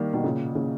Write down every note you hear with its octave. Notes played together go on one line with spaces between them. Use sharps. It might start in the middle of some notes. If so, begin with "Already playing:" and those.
Already playing: D#3 G3 A#3
B2 D#3
A#2 C#3
A#2 C#3